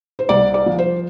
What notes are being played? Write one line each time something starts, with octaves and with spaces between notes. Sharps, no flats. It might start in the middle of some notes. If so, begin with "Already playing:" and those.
C5
C2 D5
D5
F3
C5